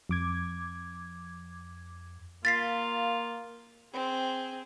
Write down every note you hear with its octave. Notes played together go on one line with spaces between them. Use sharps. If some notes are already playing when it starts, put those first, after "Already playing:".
F2 D6 G#6
A#3 F4 A6 B6 C7
C4 G#4